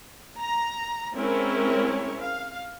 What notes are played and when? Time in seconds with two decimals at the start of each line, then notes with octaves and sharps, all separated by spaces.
0.39 A#5
1.14 G#3 C4 C#4 E4 A#4 C#5
2.21 F5